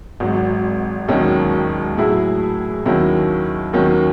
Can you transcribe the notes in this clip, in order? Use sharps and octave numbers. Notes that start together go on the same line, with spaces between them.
G#1 G#2 F#3
E1 D#2 D#3 F#3 C#4
A2 F#3 A3 E4 G#4
D#2 D#3 F#3 C#4 E4
D#2 D#3 F#3 C#4